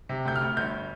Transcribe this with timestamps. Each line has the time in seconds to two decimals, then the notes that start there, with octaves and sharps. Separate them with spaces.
0.09 C3
0.25 D2 G6
0.36 F6
0.41 D2
0.56 G1 G6